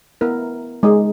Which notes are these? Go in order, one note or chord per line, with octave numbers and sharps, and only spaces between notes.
B3 E4 A#4
G#3 D#4 G#4